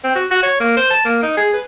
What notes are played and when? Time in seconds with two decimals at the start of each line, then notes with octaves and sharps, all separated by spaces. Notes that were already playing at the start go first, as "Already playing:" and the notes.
0.04 C4
0.15 F#4
0.31 F#4
0.43 C#5
0.60 A#3
0.77 C5
0.90 A5
1.05 A#3
1.23 D#4
1.37 G#4
1.53 B4